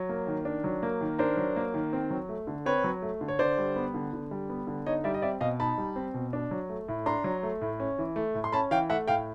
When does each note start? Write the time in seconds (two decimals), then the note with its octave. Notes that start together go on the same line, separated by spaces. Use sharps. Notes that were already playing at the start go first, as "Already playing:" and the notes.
Already playing: F#3
0.09 A#3
0.27 D#3
0.45 D4
0.64 F#3
0.83 A#3
1.01 D#3
1.18 D4 A#4 C5
1.37 F#3
1.56 A#3
1.74 D#3
1.93 C4
2.10 F#3
2.29 A3
2.47 D3
2.66 C4 B4 C#5
2.84 F#3
3.02 A3
3.21 D3
3.28 C#5
3.39 D3 C5 D5
3.58 G3
3.76 B3
3.94 D3
4.13 D3
4.31 G3
4.50 B3
4.67 D3
4.86 D#4 C#5 D#5
5.04 G3 D5 E5
5.14 D#5
5.22 C4 D5 E5
5.41 B2 D#5 F5
5.60 D#4 A5 B5
5.78 G3
5.96 C4
6.14 B2
6.33 D4
6.51 F#3
6.69 A3
6.88 A2
7.06 D4 A#5 C6
7.24 F#3
7.43 A3
7.61 A2
7.80 C#4
7.98 E3
8.16 A3
8.35 A2
8.44 C6
8.52 C#4 A5 B5
8.71 E3 F5 G5
8.90 A3 E5 F#5
9.08 A2 F5 G5